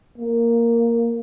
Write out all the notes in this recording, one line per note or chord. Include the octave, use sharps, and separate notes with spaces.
A#3